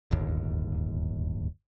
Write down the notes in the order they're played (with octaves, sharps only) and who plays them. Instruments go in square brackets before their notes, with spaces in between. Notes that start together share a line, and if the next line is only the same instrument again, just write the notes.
[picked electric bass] D1 G1 D#2